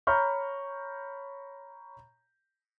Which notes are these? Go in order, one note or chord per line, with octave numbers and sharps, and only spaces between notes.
C#5 A#5 B5 C#6 F6 G6